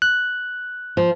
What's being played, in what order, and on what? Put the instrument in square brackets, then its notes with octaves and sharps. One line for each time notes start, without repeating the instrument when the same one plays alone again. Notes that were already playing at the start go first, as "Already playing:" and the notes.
[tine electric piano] F#6
[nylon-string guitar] F3